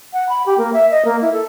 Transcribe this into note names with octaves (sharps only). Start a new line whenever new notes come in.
F#5
B5
G4
A#3
E5
D#5
A#3
E4
A4